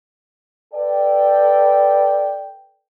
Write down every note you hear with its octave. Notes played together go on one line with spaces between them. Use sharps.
A4 B4 D5 G5